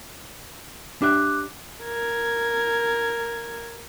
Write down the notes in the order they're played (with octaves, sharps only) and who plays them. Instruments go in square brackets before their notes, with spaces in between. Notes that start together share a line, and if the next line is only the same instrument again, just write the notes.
[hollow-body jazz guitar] D4 G4 E5 [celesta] D6 F#6
[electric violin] A#4 G#6